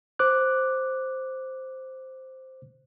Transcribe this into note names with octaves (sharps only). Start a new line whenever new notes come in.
C5 D6 F#6